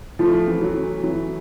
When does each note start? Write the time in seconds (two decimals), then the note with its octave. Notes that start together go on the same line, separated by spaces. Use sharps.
0.19 F3 A3
0.48 E3
0.61 F#3
0.76 C#4
1.03 E3 F#3